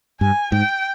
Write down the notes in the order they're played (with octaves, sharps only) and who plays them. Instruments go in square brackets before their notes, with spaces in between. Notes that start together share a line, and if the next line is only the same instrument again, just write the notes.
[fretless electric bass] G2 [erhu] G#5
[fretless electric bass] G#2 [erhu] G5